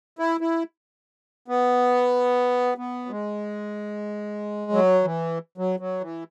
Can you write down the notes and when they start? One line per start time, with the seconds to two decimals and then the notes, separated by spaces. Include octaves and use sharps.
0.19 E4
0.41 E4
1.48 B3
2.78 B3
3.06 F#3
3.10 G#3
4.72 F#3
5.04 E3
5.58 F#3
5.80 F#3
6.01 E3